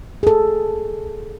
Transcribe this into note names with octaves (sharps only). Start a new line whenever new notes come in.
G#4 A4